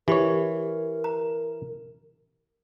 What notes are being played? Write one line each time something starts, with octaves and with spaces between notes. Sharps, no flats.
E3 G4 A#4 C#5 B5
A#5